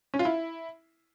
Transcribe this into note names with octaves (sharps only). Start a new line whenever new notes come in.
C#4
F4
E4